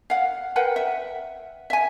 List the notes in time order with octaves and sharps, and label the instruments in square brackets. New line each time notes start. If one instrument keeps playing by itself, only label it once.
[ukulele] F5 F#5
A#4 B4 F#5 G5
E5
E5 G#5